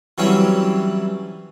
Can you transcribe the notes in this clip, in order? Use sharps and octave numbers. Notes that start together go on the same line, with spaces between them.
E3 F#3 G3 C4 C#4